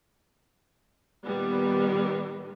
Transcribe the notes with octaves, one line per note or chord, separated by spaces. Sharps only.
A#2 D#3 G3 B3